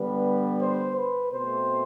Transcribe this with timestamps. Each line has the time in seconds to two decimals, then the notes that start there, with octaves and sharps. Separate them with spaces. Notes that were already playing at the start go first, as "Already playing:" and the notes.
Already playing: D3 G3 B3 B4
0.59 C5
0.96 B4
1.32 B2 A3 C4 C5